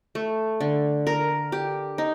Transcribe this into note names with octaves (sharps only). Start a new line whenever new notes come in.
A3
D3
A#4
G4
D#4